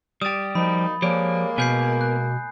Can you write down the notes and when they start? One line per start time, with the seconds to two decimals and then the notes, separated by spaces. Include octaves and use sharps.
0.22 G3 G4 D#6 A6
0.55 F3 F#3 A#3 D#4 B5
1.02 F3 G#3 A#3 G4 C#5 D5
1.58 B2 B3 A#4 B4 G#5 G6 C7
2.01 F#6